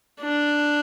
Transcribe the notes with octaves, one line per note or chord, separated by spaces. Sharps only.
D4